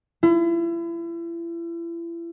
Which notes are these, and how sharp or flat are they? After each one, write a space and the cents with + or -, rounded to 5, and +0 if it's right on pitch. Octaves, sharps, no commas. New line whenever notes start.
E4 +35